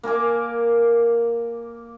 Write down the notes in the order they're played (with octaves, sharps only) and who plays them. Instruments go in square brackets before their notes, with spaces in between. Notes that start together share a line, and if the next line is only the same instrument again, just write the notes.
[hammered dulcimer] A#3 A#4 G#5 D6